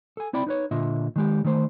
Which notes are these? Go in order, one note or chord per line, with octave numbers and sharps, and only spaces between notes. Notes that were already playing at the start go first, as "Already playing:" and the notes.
A4 G#5
C4 E4 D5 G5 B5
D#4 B4 C#5
A#2 D3 F4 D#5 E5
D#3 G#3 G4
D#3 A3 C5